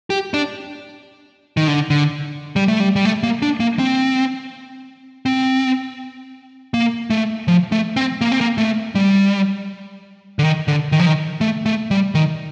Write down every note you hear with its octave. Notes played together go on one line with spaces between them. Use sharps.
G4
D4
D#3
D3
D3
G3
A3
G3
G3
A3
A#3
D4
A#3
C4
C4
A#3
A3
F3
A3
C4
A#3
C4
A#3
A3
G3
D3
D#3
D3
D#3
F3
D#3
A3
A3
G3
D#3